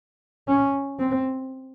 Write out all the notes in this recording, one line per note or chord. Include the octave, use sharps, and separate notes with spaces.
C#4
C4